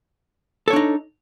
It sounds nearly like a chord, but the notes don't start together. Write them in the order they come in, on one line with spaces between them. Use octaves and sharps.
A4 C#5 D4 D#4